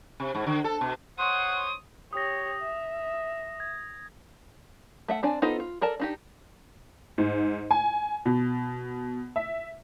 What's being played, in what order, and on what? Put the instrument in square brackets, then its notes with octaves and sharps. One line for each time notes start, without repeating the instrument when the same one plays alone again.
[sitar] C3
G#2
D3
A4
B2
[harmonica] C5 C#5 C6 [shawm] F#5 [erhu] D#6
[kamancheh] G4 C#5 [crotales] D#6 A#6
[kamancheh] E5
[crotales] G#6
[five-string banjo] A3 E5 F#5
C4 D4 D5 G#5
B3 D#4 F4 A4 C5
F4
A4 A#4 D5 A5
D4 D#4 G4
[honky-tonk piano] G#2
G#5
B2
E5